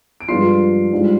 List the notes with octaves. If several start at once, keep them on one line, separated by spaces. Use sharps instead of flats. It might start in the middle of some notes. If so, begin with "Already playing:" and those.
D7
G2 F3 G#3 D4 F4 C6 C7
G#2 G3 D4 F4